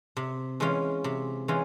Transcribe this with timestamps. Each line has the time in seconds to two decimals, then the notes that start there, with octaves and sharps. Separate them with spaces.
0.17 C3
0.60 E3 G#3 C#4 F4
1.04 C3
1.48 E3 G#3 C#4 F4